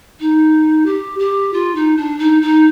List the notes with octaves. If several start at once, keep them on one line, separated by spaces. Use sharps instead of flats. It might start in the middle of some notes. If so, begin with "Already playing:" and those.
D#4
G4
G4
F4
D#4
D4
D#4
D#4